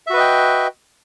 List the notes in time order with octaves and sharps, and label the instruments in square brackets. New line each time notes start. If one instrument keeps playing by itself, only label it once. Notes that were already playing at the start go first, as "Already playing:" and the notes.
[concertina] E5
F#4
B4
D#5
G5